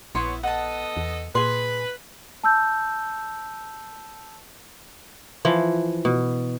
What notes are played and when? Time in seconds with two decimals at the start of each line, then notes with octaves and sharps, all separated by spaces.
0.15 A#1 B3 E4 C#5 C6
0.43 B3 A4 D#5 F#5 A5
0.97 E2
1.35 A#2 G#4 B4 C6
2.44 A5 E6 G6
5.45 E3 F3
6.05 B2